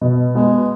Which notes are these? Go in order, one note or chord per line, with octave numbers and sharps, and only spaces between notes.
B2
G#3 B3